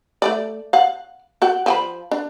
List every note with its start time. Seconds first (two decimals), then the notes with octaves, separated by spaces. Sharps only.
0.22 A3 B3 D5
0.73 F5 F#5
1.42 F#4 F#5 G5
1.66 F3 G5 B5
2.11 D4